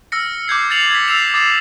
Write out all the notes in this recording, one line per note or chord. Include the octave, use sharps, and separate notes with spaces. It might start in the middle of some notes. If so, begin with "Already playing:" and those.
E6 F6 A#6 C#7
D6 G6 G#6 C7
A6 C7 C#7 F7 F#7
G#6 B6
E6 A6 C7 C#7 E7 F7
D6 D#6 A6 C7 E7